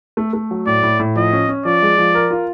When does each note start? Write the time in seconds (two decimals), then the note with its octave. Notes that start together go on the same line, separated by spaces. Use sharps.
0.17 A3
0.33 A3
0.51 F#3
0.67 A2 D5
0.83 A2
0.99 A2
1.16 F3 D#5
1.33 C#4
1.49 C#4
1.65 F3 D5
1.82 G#3
1.98 F3
2.15 A#4
2.31 F4